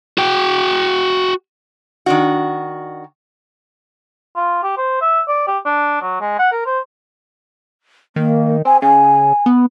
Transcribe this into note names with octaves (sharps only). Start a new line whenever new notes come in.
F#4 G5
D#3 D4 F#4
F4
G4
C5
E5
D5
G4
D4
F#3
G#3
F#5
A#4
C5
D#3 A#3
C4 G#5
C#3 G#5
B3